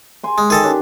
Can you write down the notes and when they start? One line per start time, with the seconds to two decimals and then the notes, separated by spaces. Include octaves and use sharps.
0.24 G#5 C6
0.38 G#3
0.50 D#3 G#4 A4 D#5
0.63 C#4 D4 G4